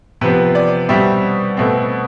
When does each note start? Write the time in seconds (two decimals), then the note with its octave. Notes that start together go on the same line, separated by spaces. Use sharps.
0.21 C3 F3 B3 B4
0.55 D5
0.89 B2 G3 C4 E5
1.57 B2 A3 C4